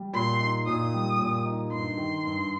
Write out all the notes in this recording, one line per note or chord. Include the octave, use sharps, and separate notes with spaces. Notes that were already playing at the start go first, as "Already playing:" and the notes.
Already playing: G3
A#2 C6
D#4
A#2 D#6
G3
A#2
D#4
G2 C6
D#3
G2